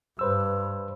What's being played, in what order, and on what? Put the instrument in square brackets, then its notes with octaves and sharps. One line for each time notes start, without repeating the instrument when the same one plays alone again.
[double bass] G2 [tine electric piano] B4 C5 E6